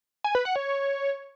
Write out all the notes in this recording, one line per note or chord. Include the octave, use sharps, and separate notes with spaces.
G#5
B4
F#5
C#5